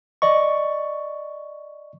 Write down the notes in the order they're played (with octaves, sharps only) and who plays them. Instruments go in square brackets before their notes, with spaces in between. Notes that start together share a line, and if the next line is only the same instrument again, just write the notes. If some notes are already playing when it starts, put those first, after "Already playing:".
[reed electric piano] D5 D#5 C#6